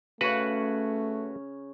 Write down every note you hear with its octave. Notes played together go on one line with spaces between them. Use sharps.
C#3 A3 C#4 F#4 B4 C#5 F#5